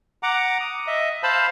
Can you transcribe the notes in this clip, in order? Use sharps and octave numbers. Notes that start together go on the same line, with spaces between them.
F#5 A#5 D6
D#6
D#5 E5
C5 F5 A5 B5